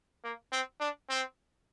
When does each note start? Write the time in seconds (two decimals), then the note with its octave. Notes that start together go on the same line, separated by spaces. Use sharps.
0.24 A#3
0.53 C4
0.81 D4
1.10 C4